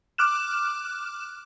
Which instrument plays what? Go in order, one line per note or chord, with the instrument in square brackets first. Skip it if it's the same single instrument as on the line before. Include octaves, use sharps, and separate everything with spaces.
[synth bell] D6 F6 F#6 E7